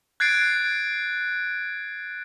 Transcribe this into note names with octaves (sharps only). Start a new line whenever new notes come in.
F#6 G#6 A6 C7 D7